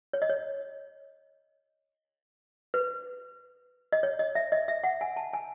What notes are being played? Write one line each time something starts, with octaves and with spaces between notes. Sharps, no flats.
C#5
D#5
C#5
B4
D#5
C#5
D#5
E5
D#5
E5
F#5
G#5
A5
G#5